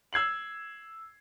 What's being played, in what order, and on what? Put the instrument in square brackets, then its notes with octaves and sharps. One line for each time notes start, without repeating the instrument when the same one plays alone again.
[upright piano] E6 G#6 C7 F#7